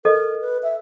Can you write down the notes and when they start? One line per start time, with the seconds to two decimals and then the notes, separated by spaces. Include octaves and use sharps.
0.05 A4 A#4 D#5
0.41 B4
0.63 E5